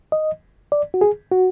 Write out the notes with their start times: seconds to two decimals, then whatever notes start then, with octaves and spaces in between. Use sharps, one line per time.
0.12 D#5
0.72 D5
0.94 F#4
1.01 G#4
1.32 F#4